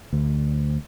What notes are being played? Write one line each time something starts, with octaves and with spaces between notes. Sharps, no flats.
D2